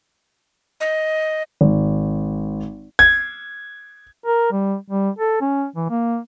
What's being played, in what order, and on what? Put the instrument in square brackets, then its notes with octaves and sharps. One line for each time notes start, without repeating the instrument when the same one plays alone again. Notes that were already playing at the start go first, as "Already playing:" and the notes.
[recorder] D#5
[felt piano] G#1
[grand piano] G#6
[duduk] A#4
G3
G3
A4
C#4
E3
A#3